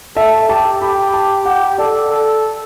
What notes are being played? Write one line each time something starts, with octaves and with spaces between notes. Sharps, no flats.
A4 E5
G4 A5
G4 B5
A5
G4 F#5
A4 D5
A4